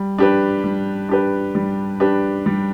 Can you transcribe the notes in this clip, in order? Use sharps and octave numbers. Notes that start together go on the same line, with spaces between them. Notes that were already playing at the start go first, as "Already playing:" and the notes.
Already playing: G3
D4 G4 B4
G3
D4 G4 B4
G3
D4 G4 B4
G3